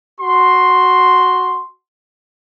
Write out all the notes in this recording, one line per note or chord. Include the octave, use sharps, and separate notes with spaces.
F#4 C6